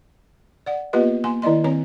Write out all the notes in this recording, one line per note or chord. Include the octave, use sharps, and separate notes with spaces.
D5 F#5
A#3 B3 F4 G4 B4 D#5
A#3 G#5 C6
D#3 E4 D5 D#5 C6
D#3 C4 C#5 A#5